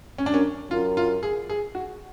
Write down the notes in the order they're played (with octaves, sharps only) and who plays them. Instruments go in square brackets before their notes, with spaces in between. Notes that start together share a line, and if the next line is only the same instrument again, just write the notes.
[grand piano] C#4
D4
[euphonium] F#2 [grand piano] C#4
[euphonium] F#2 [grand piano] F4
[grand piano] F4
G#4
G#4
F#4